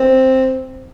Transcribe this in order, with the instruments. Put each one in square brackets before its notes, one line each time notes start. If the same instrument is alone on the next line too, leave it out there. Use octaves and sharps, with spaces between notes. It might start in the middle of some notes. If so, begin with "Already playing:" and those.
Already playing: [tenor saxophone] C4